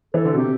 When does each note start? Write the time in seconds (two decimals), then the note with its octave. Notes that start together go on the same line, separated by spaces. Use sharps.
0.14 E3 A4
0.25 D3
0.33 B2
0.37 C3 G4